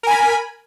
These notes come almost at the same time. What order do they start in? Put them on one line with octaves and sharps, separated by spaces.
A#4 G#5 B5